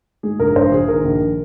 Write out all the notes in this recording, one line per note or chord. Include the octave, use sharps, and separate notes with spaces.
G#2 G#4
A#1 A#4
A#1 C5
A#1 G#4
D#3 A#4
A#1